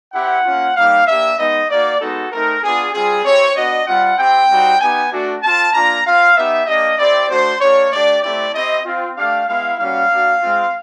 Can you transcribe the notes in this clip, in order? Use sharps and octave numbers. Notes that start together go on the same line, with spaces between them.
C4 E4 G4 F#5
A#3 C#4 F4
G3 A#3 D#4 G4 F5
A#3 D4 G4 E5
G#3 B3 D#4 D#5
A#3 D#4 F#4 D5
G#3 B3 D#4 F#4 A4
A3 C4 D#4 A#4
B3 D4 F4 G#4
G3 C4 F4 G#4
C4 E4 G4 C#5
B3 D4 F#4 D#5
G3 C4 F4 F#5
C4 E4 G4 G5
G3 C4 D#4 F#4
B3 D#4 G4 G#5
A3 D4 F#4
C4 F4 A5
A#3 D4 F4 A#5
C4 F4 F5
B3 D#4 G4 E5
A#3 D4 G4 D#5
C4 E4 G4 D5
A3 D4 F#4 C5
A#3 D4 G4 C#5
A3 D4 G4 D5
A3 C4 E4 G4 D5
C4 E4 G4 D#5
C4 F4
A3 D4 G4 F5
G#3 B3 E4 F5
G3 A#3 C#4 F#4 F5
A#3 D4 F#4
G#3 C4 F4